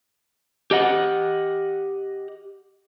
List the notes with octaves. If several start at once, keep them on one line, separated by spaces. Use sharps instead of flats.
G4 D#5 F#5